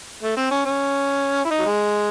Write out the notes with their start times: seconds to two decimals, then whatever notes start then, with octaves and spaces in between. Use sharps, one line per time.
0.23 A3
0.37 C4
0.51 C#4
0.65 C#4
1.45 E4
1.51 D#4
1.59 F#3
1.65 G#3